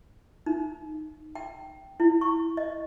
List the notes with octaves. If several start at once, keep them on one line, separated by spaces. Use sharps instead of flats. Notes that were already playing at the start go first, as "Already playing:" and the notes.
D#4
G5
E4
C#6
D#5